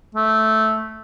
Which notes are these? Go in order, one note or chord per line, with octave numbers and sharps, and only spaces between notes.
A3